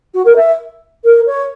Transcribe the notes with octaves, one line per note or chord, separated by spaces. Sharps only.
F#4
A#4
E5
A#4
C#5